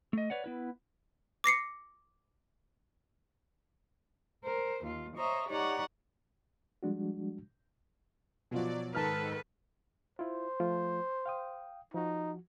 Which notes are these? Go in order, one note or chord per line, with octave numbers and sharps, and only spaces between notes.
A3 D#5
B4 C#5 D5 F#5
B3 E4 B4
D6 A#6 C7 C#7
A#4 C5
D#2 F4
C5 C#5 D#5 E5 A#5
D#4 G4 C#5 D5 F#5 A#5
F3 G3 G#3 D4 F#4
B2 F3 F#3 D5
G#2 D#3 A4 B4 A5 A#5 F6
E4 F4 C5
F3 A3 F4
F5 G5 D#6
F3 D#4 F#4